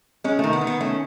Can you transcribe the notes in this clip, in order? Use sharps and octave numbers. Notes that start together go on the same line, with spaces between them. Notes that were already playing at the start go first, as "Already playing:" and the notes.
G#3 C#4
D#3 A3
B3
D#3
B3
A3 C#4